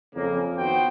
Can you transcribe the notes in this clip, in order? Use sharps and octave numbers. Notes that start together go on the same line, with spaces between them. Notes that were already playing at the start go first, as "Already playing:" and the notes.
F2 C#3 A#3
D#3 B3 C4 F#4 C5 G5